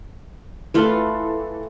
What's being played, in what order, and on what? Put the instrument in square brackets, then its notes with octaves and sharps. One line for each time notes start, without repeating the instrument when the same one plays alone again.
[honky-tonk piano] E3 A4 [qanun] A3 F4 B4